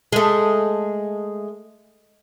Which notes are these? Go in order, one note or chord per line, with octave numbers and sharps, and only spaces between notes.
G#3 A3